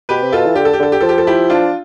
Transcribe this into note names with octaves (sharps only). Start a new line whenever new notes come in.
B2 G4 B4
C3
B2 F4 A4
E3
D3 G4
A4
G4
D3 A4
G4
F3 A4
G4
A4
E4 G4
D4 F4